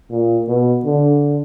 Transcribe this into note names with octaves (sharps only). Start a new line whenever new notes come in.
A#2
B2
D3